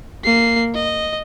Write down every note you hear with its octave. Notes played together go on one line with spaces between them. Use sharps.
A#3 C7
D#5